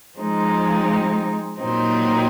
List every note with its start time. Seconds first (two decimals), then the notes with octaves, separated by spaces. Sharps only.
0.19 F3 G#3 C4 D#4
1.60 A#2 F#3 C4 D#4